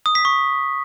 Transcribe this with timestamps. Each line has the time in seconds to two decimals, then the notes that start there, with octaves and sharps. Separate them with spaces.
0.06 D#6
0.15 B6
0.25 C#6